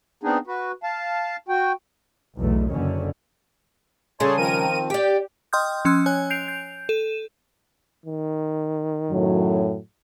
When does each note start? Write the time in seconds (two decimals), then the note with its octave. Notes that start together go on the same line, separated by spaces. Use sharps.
0.23 B3 C4 D4 D#4 G#4
0.47 F#4 B4
0.83 F5 A5
1.49 F#4 G5
2.38 B1 E2 B2 A3
2.71 F#1 D3 D#3 C#4
4.20 C#3 G3 G#4 A4 C#5 A5 C6
4.37 D#3 F3 C4 A#4 D#7
4.90 G4 D5 G5
5.53 D#5 G5 C6 D#6 F6 G6
5.85 F3 C#4 C6 E6 F#6
6.06 C#5 G#5 F#6
6.30 G6 C7 D7 F7
6.48 G6
6.89 A4 D#7 E7
8.06 D#3
9.11 F#2 A2 F#3